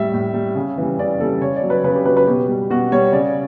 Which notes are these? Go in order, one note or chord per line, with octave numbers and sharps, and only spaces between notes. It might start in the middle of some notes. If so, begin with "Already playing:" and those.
Already playing: A2 G3 E5
A2
G3
C#3
E3 G3
C#3 D5
E3 G3 A4
C#3 C#5
D5
F#3
B4
C#3 B4
G4
F#3 B4
B4
B2 G4
G3
B2 F#4
G3 C#5
C#3 D5